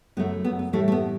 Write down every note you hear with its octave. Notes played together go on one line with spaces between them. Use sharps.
F#2 C#3 F#3 A3 B3
B3
B3
A2 E3 G3 A3
A3
B3